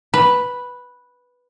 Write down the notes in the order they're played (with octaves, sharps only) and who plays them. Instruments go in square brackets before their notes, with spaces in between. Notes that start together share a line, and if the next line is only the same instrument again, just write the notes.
[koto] B4